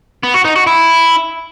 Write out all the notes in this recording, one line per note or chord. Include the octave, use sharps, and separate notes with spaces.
B3
F#4
D#4
F#4
E4